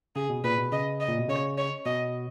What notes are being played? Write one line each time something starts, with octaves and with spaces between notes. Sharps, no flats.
C#3 G#4
B2
A#2 B4
B2
C#3 D#5
D#5
A#2
B2
C#3 C#5
C#5
B2 D#5